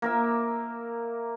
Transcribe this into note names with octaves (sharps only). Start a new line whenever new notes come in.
A#3 A#4 E5